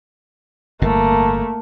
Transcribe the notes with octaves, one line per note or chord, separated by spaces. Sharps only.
G1 A2 A3 A#3